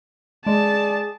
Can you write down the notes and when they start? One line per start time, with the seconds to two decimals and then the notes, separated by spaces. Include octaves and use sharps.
0.46 G#3 G#4 D5 A5